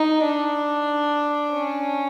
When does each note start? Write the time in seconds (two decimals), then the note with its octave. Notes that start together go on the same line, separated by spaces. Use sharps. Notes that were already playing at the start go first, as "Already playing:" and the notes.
Already playing: D#4
0.24 D4
1.52 C#4